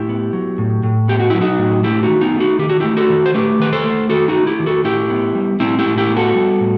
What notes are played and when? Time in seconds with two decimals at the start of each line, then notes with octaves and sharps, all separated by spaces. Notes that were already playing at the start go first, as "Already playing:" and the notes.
Already playing: A2 E4 G4
0.09 B3
0.33 F#3
0.58 A2
0.83 A2
1.08 B3 G4
1.20 F#4
1.30 F#3 E4
1.41 D#4 F#4
1.59 A2
1.84 A3 E4 G4
2.03 D#4 F#4
2.09 D#3
2.21 B3 D#4
2.34 A3
2.40 D#4 F#4
2.59 D#3 G4
2.69 F#4
2.80 A3 E4 G4
2.97 F#4 A4
3.10 D#3
3.26 C5
3.34 A3 G4 B4
3.59 D#3 B4
3.73 A4 C5
3.84 A3
4.10 D#3 F#4 A4
4.28 D#4 F#4
4.35 A3
4.47 E4 G4
4.59 D#3
4.66 F#4 A4
4.85 A2 E4 G4
5.10 B3
5.35 G3
5.60 A2 C4 E4
5.79 E4 G4
5.86 A2
5.98 E4 G4
6.10 B3
6.16 F#4 A4
6.35 G3
6.61 A2